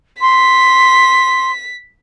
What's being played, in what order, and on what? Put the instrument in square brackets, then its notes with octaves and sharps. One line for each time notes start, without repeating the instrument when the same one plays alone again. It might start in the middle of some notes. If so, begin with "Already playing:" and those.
[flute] C6 [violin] B6